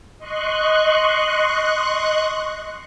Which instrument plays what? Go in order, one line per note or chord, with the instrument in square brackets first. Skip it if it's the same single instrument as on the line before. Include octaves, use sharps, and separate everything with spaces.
[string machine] D#5 C6 C#6 F#6